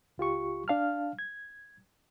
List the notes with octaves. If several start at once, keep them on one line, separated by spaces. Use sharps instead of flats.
C#2 F4 G4 C#6
D4 F5 A5 F6
G#6